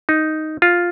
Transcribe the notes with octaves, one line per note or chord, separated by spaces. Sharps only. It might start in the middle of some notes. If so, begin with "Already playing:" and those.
D#4
F4